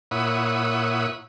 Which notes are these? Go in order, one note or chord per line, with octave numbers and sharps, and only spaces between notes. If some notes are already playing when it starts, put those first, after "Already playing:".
A#2 E4 C#5 F#5 B5 D#6